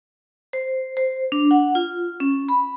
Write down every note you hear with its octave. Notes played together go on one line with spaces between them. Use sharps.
C5
C5
D4
F#5
F4
C#4
B5